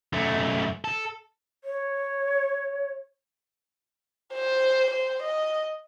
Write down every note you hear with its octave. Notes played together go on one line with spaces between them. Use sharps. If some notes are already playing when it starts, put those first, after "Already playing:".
F#2 A3
A4
C#5
C5
C5
D#5